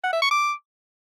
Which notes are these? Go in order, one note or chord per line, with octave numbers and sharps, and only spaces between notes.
F#5
E5
C#6
D6